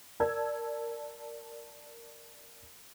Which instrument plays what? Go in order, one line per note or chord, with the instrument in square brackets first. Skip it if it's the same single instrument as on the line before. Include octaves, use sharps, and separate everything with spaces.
[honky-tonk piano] A#4 D5 A5 E6 G#6